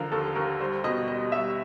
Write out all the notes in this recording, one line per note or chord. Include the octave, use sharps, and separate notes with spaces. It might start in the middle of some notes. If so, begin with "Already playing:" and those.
Already playing: D3 F3 A#4
D#2 A4
D#2 A#4
G3 C5
B2 D#5
G3 D#5
G3 E5